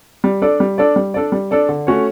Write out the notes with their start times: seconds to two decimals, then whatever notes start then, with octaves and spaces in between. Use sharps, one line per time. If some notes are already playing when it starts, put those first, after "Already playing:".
0.24 G3
0.42 D4 A4 D5
0.60 G3
0.78 D4 A4 D5
0.96 G3
1.14 D4 A4 D5
1.32 G3
1.51 D4 A4 D5
1.69 D3
1.87 A3 C#4 F#4 C#5